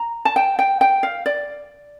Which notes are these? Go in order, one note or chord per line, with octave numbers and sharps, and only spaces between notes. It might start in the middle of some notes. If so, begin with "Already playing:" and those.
Already playing: A#5
A5
G5
G5
G5
F5
D5